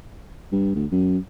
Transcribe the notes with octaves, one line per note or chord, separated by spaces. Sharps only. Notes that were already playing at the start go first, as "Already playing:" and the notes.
G2
D2
F#2